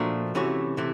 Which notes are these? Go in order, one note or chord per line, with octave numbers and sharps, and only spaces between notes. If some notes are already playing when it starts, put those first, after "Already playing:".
Already playing: A#2 F3 A3 D4 F#4
C3 E3 A3 C#4 F#4
C3 E3 A3